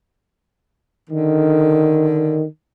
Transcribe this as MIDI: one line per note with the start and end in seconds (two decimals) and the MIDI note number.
1.10 2.44 50
1.10 2.44 51